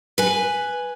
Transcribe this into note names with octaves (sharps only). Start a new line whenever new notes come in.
B4 G#5